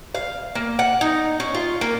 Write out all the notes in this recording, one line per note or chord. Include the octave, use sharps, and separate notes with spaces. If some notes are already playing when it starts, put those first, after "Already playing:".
F5
A#3
F#5
D#4
C#4
F4
A#3